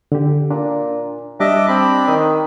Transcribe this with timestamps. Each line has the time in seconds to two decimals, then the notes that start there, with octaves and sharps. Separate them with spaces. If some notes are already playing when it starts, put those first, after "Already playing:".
0.12 D3 G4
0.51 A#2 D4
1.40 G3 D4 G4 D#5 E5 D6
1.68 C4 B5
2.08 D#3 D#6